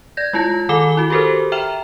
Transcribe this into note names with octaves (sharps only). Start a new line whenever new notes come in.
D5 G6 G#6 A#6
G#3 E4 F4 A5 A#6
D#3 A4 G#5 D6 E7 G7
E4 F#4
F#4 G4 A4 A#4 C5
E5 G5 A#5 F6 E7 F7